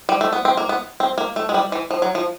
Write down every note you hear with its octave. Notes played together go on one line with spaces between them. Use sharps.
G3
A3
B3
C4
A#3
B3
C4
A#3
A3
G#3
G3
E3
F3
F#3
F3